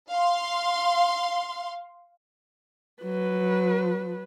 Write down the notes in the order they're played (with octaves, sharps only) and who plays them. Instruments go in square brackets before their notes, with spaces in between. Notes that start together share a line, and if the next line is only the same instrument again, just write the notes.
[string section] F5 C6
[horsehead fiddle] F#3 B4